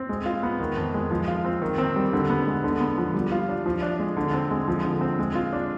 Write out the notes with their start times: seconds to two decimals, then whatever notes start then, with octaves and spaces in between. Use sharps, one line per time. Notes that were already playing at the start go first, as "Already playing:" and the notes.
Already playing: C4
0.09 G#3
0.26 F4
0.43 B3
0.60 D#3
0.77 F2
0.94 G#3
1.11 F3
1.28 F4
1.45 C4
1.62 D#3
1.78 C4
1.96 G3
2.13 D3
2.30 B3
2.47 G#3
2.64 D3
2.80 B3
2.98 F3
3.14 G3
3.32 F4
3.49 D4
3.66 F3
3.83 D4
3.99 G#3
4.17 D3
4.34 C4
4.51 G#3
4.68 F3
4.85 D3
5.01 C4
5.19 G#3
5.35 F4
5.53 D4